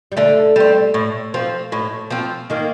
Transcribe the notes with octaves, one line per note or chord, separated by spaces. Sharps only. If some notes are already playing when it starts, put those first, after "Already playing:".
G3
D3 A3
G3 C4
A2
F3 C4
A2
F3 C4
D#3 A#3